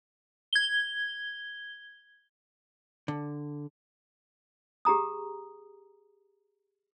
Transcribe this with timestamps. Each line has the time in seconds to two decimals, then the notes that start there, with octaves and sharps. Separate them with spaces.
0.53 G#6 G7
3.08 D3
4.85 G4 G#4 A#5 D#6